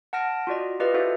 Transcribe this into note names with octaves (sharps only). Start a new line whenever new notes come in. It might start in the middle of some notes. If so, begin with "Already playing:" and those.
F#5 A5 F6 A#6 D7
F4 F#4 D5 D#5
F4 G4 B4 D5 D#5 F5
E4 F#4 A4 C5 E5 F5